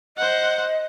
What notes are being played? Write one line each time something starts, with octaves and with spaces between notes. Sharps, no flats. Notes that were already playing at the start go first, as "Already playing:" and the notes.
C5 D#5 F#5